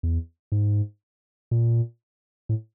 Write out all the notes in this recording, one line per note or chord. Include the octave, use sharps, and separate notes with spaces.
E2
G#2
A#2
A2